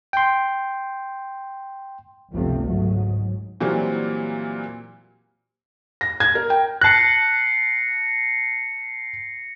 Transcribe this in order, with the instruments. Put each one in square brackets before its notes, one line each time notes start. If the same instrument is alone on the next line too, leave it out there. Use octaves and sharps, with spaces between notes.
[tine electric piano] G5 C6
[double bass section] G1 C#2 C3 F3 A3
G#2 F#3
[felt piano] A#2 E3 F#3 G3 A#3 C4
A#6
G#6
A#4
G5
[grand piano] A5 F#6 [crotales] A#6 C7 C#7